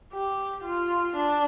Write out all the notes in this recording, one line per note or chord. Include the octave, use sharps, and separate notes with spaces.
G4
F4
D4